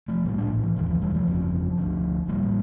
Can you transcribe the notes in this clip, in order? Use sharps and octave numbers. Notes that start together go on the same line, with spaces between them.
F3 A3
A#1 A2 G3 A#3
A#3 D4
E3
E1 D2 D3 E3
D3 F3
E3 G3
F3 A3
G1 F2 C#3
D2 D3
A1 A2 G3 A#3